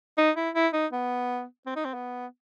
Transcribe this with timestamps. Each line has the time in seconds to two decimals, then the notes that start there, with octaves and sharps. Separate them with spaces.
0.18 D#4
0.36 E4
0.55 E4
0.73 D#4
0.92 B3
1.66 C4
1.76 D#4
1.85 C4
1.94 B3